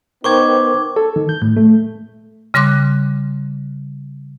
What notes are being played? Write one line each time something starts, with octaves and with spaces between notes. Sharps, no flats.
B3 D#4 A#4 C5 G5 C#6 D6 G#6
A4
D#3
G6
A2
A3
C#3 G3 C6 D6 F#6